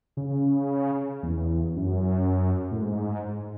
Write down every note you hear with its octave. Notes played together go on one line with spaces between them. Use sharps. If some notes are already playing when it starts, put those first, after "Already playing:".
C#3
E2
F#2
A2
G#2